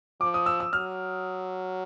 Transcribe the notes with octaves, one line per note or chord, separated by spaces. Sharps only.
F3 D6
D#6
E6
E6
F#3 F6